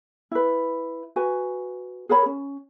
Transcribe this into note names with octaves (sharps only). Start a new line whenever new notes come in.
E4 B4
F#4 B4 G#5
G#4 A#4 C#5 B5
C#4